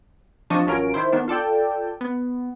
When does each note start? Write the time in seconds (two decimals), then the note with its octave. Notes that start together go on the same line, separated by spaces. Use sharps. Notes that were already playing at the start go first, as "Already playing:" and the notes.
0.50 F3 C4 D4 D#5 A5 C#6
0.67 A1 F#3 C#4 F4 A#4 D7
0.94 D#3 E4 C5
1.12 D#3 B3 D4
1.28 F4 A4 D5 G5
2.01 B3